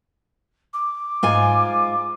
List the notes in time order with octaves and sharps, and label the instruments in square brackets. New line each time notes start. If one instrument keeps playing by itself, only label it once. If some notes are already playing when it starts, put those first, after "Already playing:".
[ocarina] D6
[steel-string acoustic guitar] G#2 F4 G#5